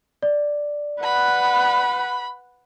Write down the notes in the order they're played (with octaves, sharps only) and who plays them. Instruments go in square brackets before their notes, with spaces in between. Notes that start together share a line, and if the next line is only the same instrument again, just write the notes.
[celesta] D5
[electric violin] B4 F#5 [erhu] B5